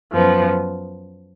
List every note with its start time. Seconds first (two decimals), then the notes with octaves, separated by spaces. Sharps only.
0.13 F#2 F3 B3